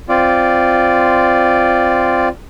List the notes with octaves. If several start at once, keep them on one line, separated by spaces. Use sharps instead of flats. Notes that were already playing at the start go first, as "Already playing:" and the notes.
C4 F4 D5